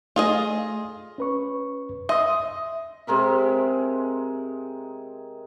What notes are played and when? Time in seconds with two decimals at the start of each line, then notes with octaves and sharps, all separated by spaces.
0.16 A3 F4 G#4 D#5
1.18 C#4 B4 C#6
2.09 D#5 E5 C6 D#6
3.07 C3 G#3 A#4 E5